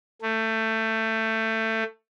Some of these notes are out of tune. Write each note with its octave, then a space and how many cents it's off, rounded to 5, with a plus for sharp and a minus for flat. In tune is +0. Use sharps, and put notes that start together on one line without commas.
A3 +20